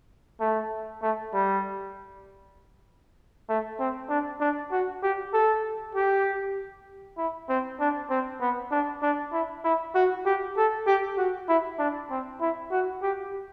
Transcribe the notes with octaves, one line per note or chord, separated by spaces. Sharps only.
A3
A3
G3
A3
C4
D4
D4
F#4
G4
A4
G4
E4
C4
D4
C4
B3
D4
D4
E4
E4
F#4
G4
A4
G4
F#4
E4
D4
C4
E4
F#4
G4